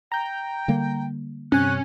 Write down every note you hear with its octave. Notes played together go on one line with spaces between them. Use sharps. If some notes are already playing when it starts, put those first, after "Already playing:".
G5 A#5 G6
D3 G3 A#3
G2 C3 C#4 G#5 F#6